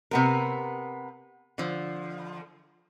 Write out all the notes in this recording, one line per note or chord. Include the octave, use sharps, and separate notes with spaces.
C3 B3 A#4
D3 F3